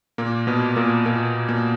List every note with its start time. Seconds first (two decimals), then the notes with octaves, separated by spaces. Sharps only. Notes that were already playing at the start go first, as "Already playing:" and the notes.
0.18 A#2 A#3
0.47 B2 B3
0.76 A#2 A#3
1.06 A#2 A#3
1.48 A#2 A#3